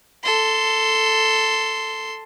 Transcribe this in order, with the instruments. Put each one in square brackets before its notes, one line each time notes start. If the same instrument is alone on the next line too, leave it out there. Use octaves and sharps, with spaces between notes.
[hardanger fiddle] A4 C6